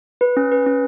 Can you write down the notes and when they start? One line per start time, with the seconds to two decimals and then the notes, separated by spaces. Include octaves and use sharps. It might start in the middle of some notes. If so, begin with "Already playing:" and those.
0.21 B4
0.37 C#4
0.52 B4
0.66 C#4